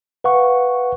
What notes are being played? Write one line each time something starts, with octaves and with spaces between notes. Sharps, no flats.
B4 F5 F#5 C#6